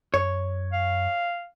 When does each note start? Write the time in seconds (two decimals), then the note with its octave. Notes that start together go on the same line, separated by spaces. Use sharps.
0.14 F#2 C#5
0.73 F5